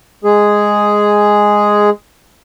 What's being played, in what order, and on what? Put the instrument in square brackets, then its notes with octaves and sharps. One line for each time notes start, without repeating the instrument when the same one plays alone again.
[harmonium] G#3 G#4